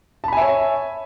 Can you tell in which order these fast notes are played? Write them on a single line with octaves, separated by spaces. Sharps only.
A5 B5 G#5 E5 C#5